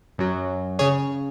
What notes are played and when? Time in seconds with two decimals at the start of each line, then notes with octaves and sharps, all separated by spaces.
0.18 F#2 F#3
0.79 C#3 G#4 C#5